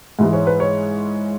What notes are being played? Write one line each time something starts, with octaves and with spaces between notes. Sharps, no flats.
G#2 E3 G#3
C#5
B4
C#5